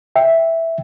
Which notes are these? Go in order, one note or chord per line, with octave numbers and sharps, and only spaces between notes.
E5 G5